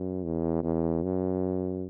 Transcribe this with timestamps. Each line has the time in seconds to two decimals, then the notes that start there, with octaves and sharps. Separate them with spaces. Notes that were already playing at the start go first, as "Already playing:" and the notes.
Already playing: F#2
0.23 E2
0.63 E2
1.03 F#2